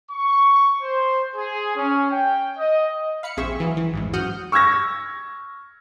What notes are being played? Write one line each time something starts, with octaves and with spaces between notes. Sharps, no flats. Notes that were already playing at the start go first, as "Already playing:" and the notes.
C#6
C5
G#4
C#4
G5
D#5
F5 B5 C#7
A#1 C4 G#4 E5 C#6
E3 F#3
E3
A1 E2 G#2
F#2 F#4 F#5 D#6 F6 G6
C#6 E6 F6 G#6 A#6